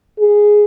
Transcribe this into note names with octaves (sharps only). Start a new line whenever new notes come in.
G#4